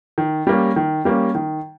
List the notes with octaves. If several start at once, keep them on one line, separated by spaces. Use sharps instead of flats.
D#3
G3 A#3 C#4
D#3
G3 A#3 C#4
D#3